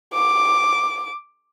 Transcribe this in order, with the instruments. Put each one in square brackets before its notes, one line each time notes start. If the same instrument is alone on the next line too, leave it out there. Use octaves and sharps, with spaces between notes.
[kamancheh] D6